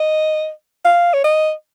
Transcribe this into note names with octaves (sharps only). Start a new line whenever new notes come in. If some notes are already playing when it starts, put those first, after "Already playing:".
Already playing: D#5
F5
C#5
D#5